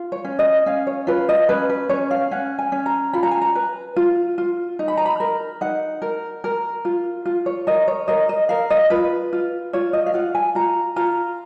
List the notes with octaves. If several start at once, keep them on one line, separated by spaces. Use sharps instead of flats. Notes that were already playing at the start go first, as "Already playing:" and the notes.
Already playing: F4
C#5
C#4
D#5
C#4 F5
C#5
F4 B4
D#5
C#4 B4
B4
C#4 C#5
F5
C#4 F#5
G#5
C#4
A#5
F4 B5
A#5
G#5
A#5
B4
F4
F4
D#4
B5
A#5
B5
A#4
D#4 F#5
A#4
A#4
F4
F4
C#5
A#4 D#5
C#5
A#4 D#5
D#5
A#4 F5
D#5
F4 B4
F4
F4 C#5
D#5
F5
F4 F#5
G#5
F4 A#5
F4 A#5